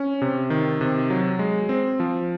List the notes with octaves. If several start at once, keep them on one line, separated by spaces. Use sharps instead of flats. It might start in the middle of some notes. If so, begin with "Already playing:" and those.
Already playing: C#4
C3
D#3
C3
F#3
G#3
C4
F3